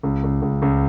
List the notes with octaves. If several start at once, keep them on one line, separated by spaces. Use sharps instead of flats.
C#2
C#2
C#2
C#2